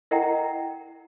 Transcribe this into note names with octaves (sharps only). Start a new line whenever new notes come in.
E4 A#4 D#5 F#5 G5 A#5